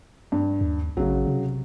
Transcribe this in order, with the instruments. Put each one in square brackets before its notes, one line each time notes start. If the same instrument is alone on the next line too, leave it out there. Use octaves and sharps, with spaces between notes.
[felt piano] G2
[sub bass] D#2
[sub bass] A1 [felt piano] C#3 F#3
[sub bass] C3